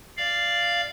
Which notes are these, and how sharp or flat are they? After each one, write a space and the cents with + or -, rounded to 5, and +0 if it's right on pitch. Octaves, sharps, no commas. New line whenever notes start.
D5 +0 F5 -10